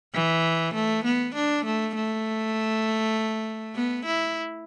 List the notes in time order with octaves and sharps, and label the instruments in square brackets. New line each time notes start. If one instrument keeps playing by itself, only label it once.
[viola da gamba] E3
A3
B3
D4
A3
A3
B3
E4